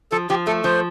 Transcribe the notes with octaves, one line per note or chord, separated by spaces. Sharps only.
F3 A4
F3 G4
A3 A4
F3 C5